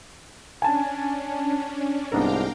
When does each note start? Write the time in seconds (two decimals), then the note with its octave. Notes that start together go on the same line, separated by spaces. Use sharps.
0.62 C#4 D4 G#5 A5
2.12 C2 G#2 B3 D4 A#4 F5 G5 A#5